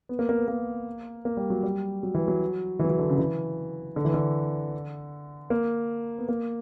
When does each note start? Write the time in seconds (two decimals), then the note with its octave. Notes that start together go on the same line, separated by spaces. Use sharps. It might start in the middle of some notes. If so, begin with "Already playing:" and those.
0.09 B3
0.19 A#3
0.29 A#3
0.38 B3
0.48 A#3
1.25 A#3
1.37 G3
1.50 F#3
1.63 G3
2.03 F#3
2.14 E3
2.28 F#3
2.79 E3
2.85 F#3
2.90 E3
2.99 D3
3.09 C#3
3.18 E3
3.96 D3
4.05 E3
4.14 D3
5.50 A#3
6.19 B3
6.29 A#3